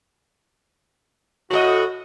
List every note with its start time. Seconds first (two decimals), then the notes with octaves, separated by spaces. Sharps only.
1.51 A2 F#4 A4 D#5